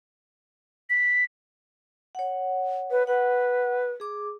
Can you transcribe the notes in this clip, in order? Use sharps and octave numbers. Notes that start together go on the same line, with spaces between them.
B6
C#5 F#5
B4
B4 F#5
G#4 D6